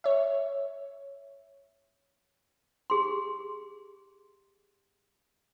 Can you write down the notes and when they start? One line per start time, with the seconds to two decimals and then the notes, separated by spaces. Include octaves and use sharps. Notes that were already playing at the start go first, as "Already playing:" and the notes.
0.04 C#5 E5
2.90 G4 G#4 C6